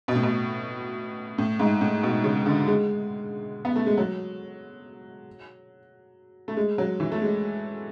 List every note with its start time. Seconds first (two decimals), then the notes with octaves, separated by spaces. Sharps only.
0.08 B2
0.15 A2
0.23 B2
1.38 A2
1.60 G#2
1.81 A2
2.03 B2
2.24 C#3
2.46 D3
2.68 G#3
3.65 B3
3.76 A3
3.86 G#3
3.97 F#3
6.48 A3
6.57 G#3
6.78 F#3
7.00 E3
7.12 A3
7.22 G#3